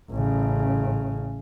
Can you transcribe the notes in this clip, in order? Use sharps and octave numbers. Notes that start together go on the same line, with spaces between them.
A1 C#3